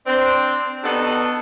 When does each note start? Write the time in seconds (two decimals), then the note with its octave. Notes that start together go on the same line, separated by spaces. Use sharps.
0.06 C4 D4
0.84 B3 D4 D#4 F#4 G4 A4